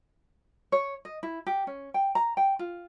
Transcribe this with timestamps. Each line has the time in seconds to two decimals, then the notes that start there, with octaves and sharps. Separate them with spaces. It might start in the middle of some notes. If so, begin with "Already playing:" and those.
0.72 C#5
1.05 D#5
1.23 E4
1.47 G4
1.67 C#4
1.94 G5
2.15 A#5
2.37 G5
2.59 F4